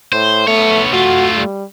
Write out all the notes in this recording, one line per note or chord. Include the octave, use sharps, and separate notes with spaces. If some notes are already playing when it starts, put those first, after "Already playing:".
A2 C5
A3 B3 C#5
A3 F4 F#4
G3